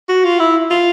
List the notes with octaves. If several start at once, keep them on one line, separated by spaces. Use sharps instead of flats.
F#4
F4
E4
F4